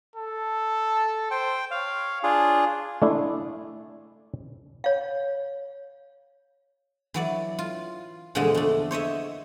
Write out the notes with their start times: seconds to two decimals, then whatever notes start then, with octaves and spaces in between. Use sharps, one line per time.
0.16 A4
1.31 C5 G5
1.71 C#5 F5
2.23 D4 F4 G#4
3.02 A3 D4 E4
4.84 C#5 F5
7.14 E3 F#3 D5
7.59 F4
8.35 E2 A#2 D3 F3 G#3 D#5
8.55 A3 D4
8.91 C5 C#5 D#5 E5